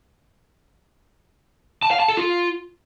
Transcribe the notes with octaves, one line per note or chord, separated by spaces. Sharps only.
A5
F5
A5
A4
F4